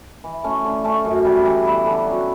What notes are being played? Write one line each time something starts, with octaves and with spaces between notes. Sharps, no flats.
E3
A3 C#4
D3
A3 C#4
F#2
E3 G3
E3
G3 B3 E4
D3
F#3 C#4 F#4